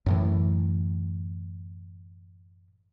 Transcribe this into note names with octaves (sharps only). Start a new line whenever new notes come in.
F#2 A2 E3